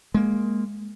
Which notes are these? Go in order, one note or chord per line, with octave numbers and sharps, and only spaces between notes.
G#3 A#3